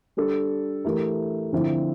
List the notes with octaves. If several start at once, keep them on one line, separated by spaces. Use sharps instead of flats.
G3 D4 A4
E3 A3 E4 G4 A#4
D3 F3 C4 E4